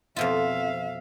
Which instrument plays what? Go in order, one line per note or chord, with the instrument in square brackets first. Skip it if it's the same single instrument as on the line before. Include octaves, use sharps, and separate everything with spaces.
[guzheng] F2 B2 F4 [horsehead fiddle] E5 F5